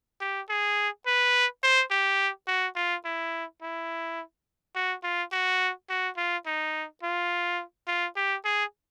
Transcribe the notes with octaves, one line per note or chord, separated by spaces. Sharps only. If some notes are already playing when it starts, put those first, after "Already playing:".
G4
G#4
B4
C5
G4
F#4
F4
E4
E4
F#4
F4
F#4
F#4
F4
D#4
F4
F4
G4
G#4